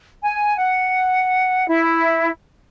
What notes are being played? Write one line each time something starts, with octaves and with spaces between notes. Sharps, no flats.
G#5
F#5
E4